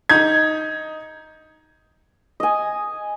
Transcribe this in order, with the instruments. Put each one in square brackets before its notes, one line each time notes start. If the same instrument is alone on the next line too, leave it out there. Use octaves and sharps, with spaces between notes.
[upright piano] D#4 G6 G#6
[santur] D#5 G#5